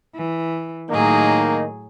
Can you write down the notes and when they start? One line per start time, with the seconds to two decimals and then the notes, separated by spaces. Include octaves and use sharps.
0.15 E3
0.90 A2 D#3 F#3 A#3 D#4 G#4